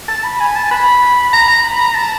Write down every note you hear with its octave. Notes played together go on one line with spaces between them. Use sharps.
A5
B5
G#5
A5
B5
A#5
A#5
B5
A#5
A5